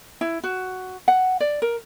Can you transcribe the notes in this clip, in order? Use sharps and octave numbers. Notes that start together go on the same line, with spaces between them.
E4
F#4
F#5
D5
A#4